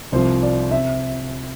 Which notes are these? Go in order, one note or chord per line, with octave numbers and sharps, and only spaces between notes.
C2 C3 F3 C5
D5
C3 E5